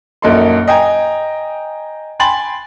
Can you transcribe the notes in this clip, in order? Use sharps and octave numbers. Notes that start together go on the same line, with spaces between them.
A#1 F#2 A#3 D#4 A4 C6
D#5 G5 G#5 A#5
G5 G#5 B5 C6 A6 F#7